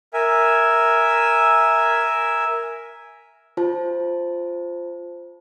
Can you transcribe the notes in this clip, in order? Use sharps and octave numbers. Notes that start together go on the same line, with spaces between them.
A#4 E5 G#5
F4 C5 A5